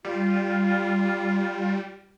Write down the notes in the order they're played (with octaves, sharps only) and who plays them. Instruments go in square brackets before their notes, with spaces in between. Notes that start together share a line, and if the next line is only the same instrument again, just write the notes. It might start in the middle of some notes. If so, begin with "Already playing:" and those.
[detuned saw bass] G3 [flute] F4